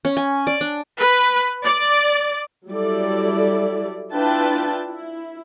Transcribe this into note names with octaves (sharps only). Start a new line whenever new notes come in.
C#4
G#5
D5
D4
B4
D5
F#3 G3 E4 A4 D5
D4 E4 F4 B4 G5 A5
E4